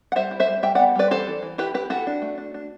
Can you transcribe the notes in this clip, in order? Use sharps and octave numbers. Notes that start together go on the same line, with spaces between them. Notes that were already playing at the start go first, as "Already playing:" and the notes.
F#5
G3 C5 E5
E4
C5 E5
G3
G3 E5 G5
D5 F#5
B3
G3 B4 D5
E3 A4 C5
E3
E3
E4 G4 B4
E4 G4 B4
E4 F#4 A4
D4
A3
D4
D4